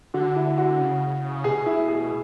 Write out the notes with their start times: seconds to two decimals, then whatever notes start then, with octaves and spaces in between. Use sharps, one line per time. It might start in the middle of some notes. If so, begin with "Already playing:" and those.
0.14 D3 F#4
0.36 E4
0.58 F#4
0.80 C#3
1.44 B2 G#4
1.66 E4
1.88 G#4